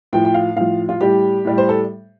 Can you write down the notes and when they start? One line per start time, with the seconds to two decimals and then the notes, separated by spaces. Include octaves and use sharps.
0.13 A2 F3 G5
0.25 G5
0.34 F5
0.56 A2 F3 F5
0.89 F4
1.00 A2 G3 G4
1.45 A2 G3
1.58 C5
1.69 A4